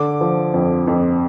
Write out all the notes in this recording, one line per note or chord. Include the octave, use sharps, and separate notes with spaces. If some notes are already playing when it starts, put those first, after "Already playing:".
Already playing: D3 D6
F3
F2
F2